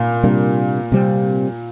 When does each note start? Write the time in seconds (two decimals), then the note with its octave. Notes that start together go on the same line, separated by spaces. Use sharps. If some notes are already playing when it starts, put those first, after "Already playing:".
Already playing: A#2
0.24 C3 G3 A#3 D4
0.92 C3 G3 C4